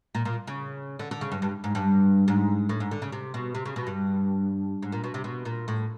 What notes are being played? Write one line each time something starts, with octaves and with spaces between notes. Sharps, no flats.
A#2
A#2
C#3
D3
D3
C#3
G2
G2
G#2
G2
G#2
A2
G#2
D3
C#3
C3
B2
C3
C#3
B2
G2
G#2
A#2
B2
C3
B2
A#2
A2